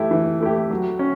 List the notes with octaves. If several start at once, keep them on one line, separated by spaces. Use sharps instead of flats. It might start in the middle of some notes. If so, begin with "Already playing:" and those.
Already playing: E3 A3 E4 G4
E3
A3 E4 G4
F#3
C#4